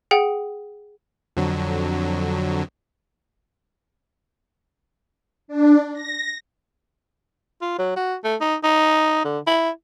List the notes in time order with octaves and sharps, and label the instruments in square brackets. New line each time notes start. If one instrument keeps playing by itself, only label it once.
[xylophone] G#4 F#5 G5
[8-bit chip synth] F2 D3 F#3
[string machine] D4
A#6
[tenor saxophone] F4
F#3
F#4
A3
D#4
D#4
D3
E4